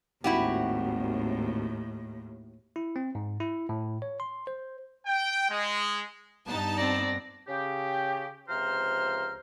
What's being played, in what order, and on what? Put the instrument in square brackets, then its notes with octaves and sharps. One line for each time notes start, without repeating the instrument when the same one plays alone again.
[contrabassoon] G#1 [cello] D#2 A2 [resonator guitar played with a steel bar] E4 F#4 G4
[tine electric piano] E4
C4
G#2
E4
A2
C#5
C6
C5
[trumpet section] G5
G#3
[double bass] G2 B3 [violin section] D#4 A5
[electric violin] C4 D5 [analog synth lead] A#6
[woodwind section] C#3 G4
C#2 C3 F3 C5 A#5 F6